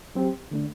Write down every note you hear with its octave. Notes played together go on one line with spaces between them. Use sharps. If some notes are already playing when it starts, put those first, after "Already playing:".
F#3 C4 G4
D3 A3 D4